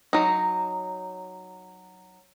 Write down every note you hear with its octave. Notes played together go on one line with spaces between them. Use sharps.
F#3 D#4